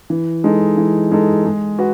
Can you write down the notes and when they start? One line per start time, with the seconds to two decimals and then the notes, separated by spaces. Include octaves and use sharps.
0.10 E3
0.44 G#3 D#4 A4
0.77 E3
1.12 G#3 D#4 A4
1.45 G#3
1.79 F#4 B4